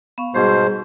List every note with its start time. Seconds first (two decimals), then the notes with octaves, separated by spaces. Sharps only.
0.18 B3 F5 C#6
0.34 G#2 B2 G3 G#4 C5